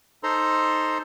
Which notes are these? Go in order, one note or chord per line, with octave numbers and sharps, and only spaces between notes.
D#4 A4 C5 A#5 C6